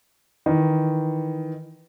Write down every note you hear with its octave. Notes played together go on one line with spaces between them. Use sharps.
D#3 E3